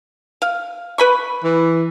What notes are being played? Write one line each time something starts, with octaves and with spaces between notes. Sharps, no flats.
F5
B4 B5 C#6
E3